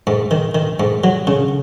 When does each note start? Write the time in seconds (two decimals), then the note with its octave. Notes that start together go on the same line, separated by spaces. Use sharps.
0.07 G#2
0.31 D#3
0.55 D#3
0.80 G#2
1.04 F#3
1.27 C#3